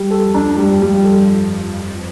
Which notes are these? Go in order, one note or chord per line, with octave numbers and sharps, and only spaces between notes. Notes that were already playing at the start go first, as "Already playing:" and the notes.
Already playing: G3
A4
F2 F3
D4
G2 G3
G3
G2
A4